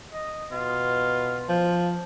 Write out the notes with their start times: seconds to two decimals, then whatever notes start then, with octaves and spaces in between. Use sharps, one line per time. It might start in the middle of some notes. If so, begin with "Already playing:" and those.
0.13 D#5
0.52 B2 F4
1.49 F3